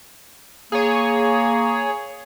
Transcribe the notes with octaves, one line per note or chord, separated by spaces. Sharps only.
A#3 G#4 C#5